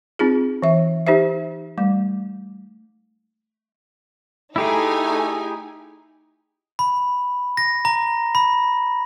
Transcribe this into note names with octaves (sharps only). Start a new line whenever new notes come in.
C4 D#4 F4 G#4
E3 E5
D#4 G4 C5 E5
G3 A3
A3 D#4 E4 G4 G#4 G#5
B5
A#6
A#5
B5